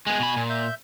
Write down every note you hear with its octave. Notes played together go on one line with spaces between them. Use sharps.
G#3 B3 G#5
B2 B5
A#2
E5 G6